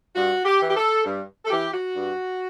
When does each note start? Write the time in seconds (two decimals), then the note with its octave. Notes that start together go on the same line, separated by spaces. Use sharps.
0.14 G2 F#4
0.44 G4
0.60 E3
0.68 G4
0.75 A4
1.04 G2
1.45 A4
1.50 E3 G4
1.73 F#4
1.95 G2